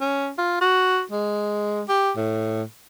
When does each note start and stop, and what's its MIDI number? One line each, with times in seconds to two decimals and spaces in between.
0.01 0.31 61
0.38 0.58 65
0.61 1.02 66
1.11 1.83 56
1.89 2.11 67
2.17 2.63 45